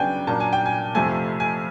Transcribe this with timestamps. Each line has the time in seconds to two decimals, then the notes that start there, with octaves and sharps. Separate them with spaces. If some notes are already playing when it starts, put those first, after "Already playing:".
Already playing: C#3 F#3 B3 D4 G5 G#5
0.27 A#2 F#3 A#3 D4 A5
0.40 G#5
0.53 G5
0.66 G#5
0.95 F2 C3 F3 A3 G#5
1.40 G#5